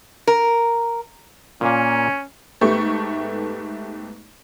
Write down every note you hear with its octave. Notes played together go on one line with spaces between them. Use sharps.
A#4
A#2 A#3 C#4
G#2 A3 B3 G4 C#6